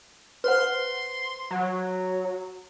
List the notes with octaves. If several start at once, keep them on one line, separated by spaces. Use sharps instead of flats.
B4 C5 F#5 C6
F#3